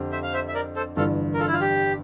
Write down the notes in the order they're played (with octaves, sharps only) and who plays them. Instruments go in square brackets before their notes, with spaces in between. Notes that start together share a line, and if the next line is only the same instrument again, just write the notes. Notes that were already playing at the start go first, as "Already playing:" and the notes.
Already playing: [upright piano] F2 D3 C4 G4
[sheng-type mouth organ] C5 E5
F5
C5 E5
E5
A#4 D5
A4 C5
[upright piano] G1 G2 E3 [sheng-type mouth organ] F4 A4
[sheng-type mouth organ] A#4
F4 A4
E4
F4
G4